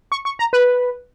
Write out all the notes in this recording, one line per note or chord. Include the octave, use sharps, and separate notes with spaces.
C#6
C#6
A#5
B4